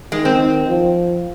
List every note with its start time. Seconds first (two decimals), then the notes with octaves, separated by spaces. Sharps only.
0.12 D#3 G#3
0.25 C4
0.39 D#3
0.68 F3